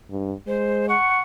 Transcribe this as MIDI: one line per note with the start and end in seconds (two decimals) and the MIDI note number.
0.10 0.33 43
0.47 0.94 56
0.47 0.89 72
0.89 1.20 78
0.89 1.20 85